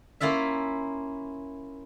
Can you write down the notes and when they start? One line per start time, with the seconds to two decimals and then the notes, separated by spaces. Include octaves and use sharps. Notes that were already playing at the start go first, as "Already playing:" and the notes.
0.20 A#3 C#4 E4 F4 E5